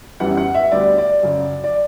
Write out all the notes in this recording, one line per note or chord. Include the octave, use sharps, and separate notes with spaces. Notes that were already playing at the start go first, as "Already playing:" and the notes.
F#2 E3 G3 B3 F#5
F#5
E5
D2 D3 G3 B3 D5
D5
F#2 C#3 F#3
D5